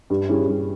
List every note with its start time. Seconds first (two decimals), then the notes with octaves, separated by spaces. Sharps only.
0.10 G2
0.29 G3 C#4 E4 G#4
0.48 G2